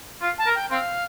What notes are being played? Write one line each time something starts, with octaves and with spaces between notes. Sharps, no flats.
F4
A5
A#4
G5
C4 F5